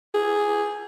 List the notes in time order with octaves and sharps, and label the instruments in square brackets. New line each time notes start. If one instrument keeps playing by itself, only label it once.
[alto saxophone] G#4